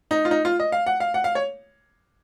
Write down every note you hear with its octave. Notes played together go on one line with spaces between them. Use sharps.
D#4
F4
D#4
F4
D#5
F5
F#5
F5
F#5
F5
C#5